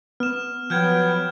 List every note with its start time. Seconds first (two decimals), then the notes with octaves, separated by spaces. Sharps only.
0.20 B3 F6 E7
0.70 F3 F#3 B3 G5 F6 G6 G#6